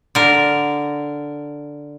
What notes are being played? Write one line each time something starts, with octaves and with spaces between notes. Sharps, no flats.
D3 A#4